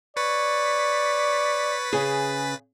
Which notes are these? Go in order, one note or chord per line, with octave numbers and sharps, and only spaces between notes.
B4 C#5 D5 A6 B6
C#3 G#4